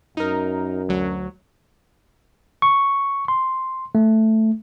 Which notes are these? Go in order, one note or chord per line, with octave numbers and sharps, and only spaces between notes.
F#2 D#4 A#4
D2 F#3
C#6
C6
A3